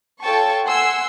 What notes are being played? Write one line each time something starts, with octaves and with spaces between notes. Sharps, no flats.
F4 A4 C#5 G5 A5 C#6
F#5 G#5 C6 E6